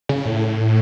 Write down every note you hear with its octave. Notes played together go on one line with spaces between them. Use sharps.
C#3
A2